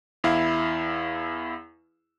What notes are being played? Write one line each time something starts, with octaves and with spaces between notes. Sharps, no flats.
E2 E4 F5